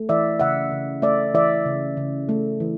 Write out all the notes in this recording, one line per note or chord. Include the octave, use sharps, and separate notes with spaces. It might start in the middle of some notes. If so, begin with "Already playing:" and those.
Already playing: A3
E3 D5 E5
C#3 E5 F#5
C#3
A3 D5 E5
E3 D5 E5
C#3
C#3
A3
E3